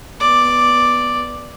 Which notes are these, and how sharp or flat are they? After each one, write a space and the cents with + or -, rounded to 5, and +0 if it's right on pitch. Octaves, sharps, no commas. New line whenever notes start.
B3 -5 D5 +0